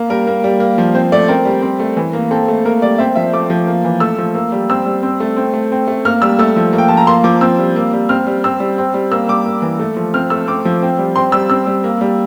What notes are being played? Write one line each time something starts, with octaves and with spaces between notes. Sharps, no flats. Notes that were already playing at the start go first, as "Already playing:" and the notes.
Already playing: A#3
G3 A#4
A#3
G3
A#3
F3
C4 C5
A3 D5
C4 A#4
G3
C4
A3
E3
A#3
C4 A4
A3
A#3 A#4
G3 D5
C4 E5
F3 E5
A3 D6
F3
A#3
E3
A3 E6
F3
A#3
G3
C4 E6
G3
C4
A3
C4
A3
C4
A3
A#3 F6
G3 E6
A3 E6
F3
A#3
G5
F3 A5
A#5
A#3 C6
F3 D6
C4 E6
G3
A#3
G3
C4 F6
G3
C4 E6
G3
C4
G3
A#3 E6
G3 D6
A#3
E3
A3
F3
C4 F6
A3 E6
C4 D6
F3
C4
G3
C4 C6
G3 E6
C4 E6
G3
A#3
G3